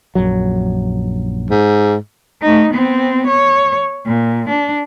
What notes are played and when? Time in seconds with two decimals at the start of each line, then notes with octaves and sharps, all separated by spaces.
0.15 A#1 F#2 F#3
1.50 G#2
2.42 A3 D#4
2.71 B3 C4
3.27 C#5
4.06 A#2
4.49 D4